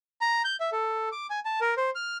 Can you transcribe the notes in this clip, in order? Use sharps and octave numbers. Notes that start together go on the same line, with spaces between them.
A#5
G6
E5
A4
D6
G#5
A5
A#4
C5
F6